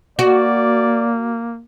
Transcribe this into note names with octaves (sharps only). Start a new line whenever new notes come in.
A#3 F#4 D5